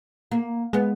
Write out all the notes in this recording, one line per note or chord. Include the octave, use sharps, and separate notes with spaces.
A#3
G#3 B3